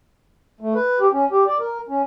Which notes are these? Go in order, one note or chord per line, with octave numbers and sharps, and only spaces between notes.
A3
B4
G4
C#4
G4
D5
A#4
C#4